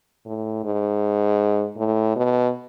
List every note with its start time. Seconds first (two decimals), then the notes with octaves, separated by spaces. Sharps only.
0.26 A2
0.64 G#2
1.77 A2
2.16 B2